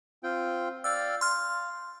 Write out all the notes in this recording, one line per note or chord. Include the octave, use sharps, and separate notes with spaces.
C4 F4 G5
D5 F5 G5 E6
F5 C6 F6